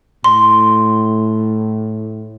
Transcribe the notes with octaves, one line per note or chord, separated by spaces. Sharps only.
A2 C6